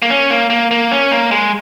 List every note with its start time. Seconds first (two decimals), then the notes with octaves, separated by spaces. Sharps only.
0.02 A#3
0.10 C#4
0.30 A#3
0.50 A#3
0.71 A#3
0.91 C#4
1.12 A#3
1.31 G#3